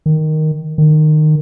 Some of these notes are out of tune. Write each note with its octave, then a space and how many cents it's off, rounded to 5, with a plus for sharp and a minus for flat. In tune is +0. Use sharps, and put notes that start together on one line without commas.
D#3 +0
D#3 -20